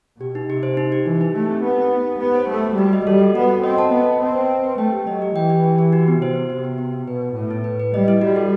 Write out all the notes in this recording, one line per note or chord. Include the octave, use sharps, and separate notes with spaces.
B2 G4
D#4
C3 G4
C5
D#4
G4
E3 G4
D#4
A3 G4
C4
B3 G4
D#4
G4
D#4
B3 G4
C5
A3 A4
F#4
G3 F#4
D#5
G3 A4
F#4
B3 F#4
A4
C4 D#5
A5
B3 D#5
A5
C4 D#5
B4
B4
B4
A3 G5
G4
F#3 D#5
G4
E3 G5
G4
G4
G4
F#4
B3
C3 C5
B3
C3 F#4
B3
B3
B3
B2 B4
B4
A2 B4
E4
B4
B4
G3 D#5
E4
G3 F#4
A4